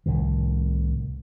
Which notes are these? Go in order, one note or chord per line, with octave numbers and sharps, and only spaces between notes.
C2 A2 D#3